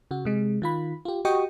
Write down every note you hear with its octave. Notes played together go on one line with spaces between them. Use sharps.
C#3 F#4
C3 G#3
D#3 F4 B5
F4 G4
F#4 G4 D#5 G5 C#6 D#6